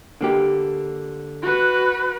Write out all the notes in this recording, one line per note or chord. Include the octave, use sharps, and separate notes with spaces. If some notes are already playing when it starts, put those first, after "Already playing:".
D3 A#3 G4
F#4 B4